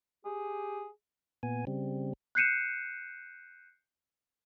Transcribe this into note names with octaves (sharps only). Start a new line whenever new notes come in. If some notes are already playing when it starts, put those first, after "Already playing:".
G4 G#4
A#2 B3 G#5
C#3 G3 C4
F#6 G6 C7 C#7 D#7 E7